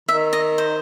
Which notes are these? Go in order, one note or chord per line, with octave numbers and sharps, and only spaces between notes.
D#3 E5
D#5
C5